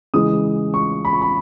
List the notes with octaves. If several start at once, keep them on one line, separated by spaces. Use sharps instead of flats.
C#3 E3 G#3 D#6
C#6
B5
C#6
B5